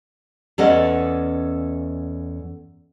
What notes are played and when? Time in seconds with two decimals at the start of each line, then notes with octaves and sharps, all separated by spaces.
0.58 E2 C#4 A4 D5 D#5 F#5